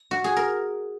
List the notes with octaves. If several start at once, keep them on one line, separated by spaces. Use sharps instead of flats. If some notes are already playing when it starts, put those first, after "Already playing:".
Already playing: E4
F#4
G#4
A#4